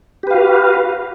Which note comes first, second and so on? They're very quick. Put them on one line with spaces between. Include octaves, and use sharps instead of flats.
G4 B4 F5 F#4